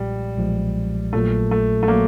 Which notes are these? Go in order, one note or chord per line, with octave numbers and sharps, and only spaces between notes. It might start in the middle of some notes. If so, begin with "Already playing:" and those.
Already playing: B1 A#2 F3 G3 G#3
B1 A#2 F3 G#3
A#1 A#2 F#3 A3
A3
A3
A#2 F#3 A#3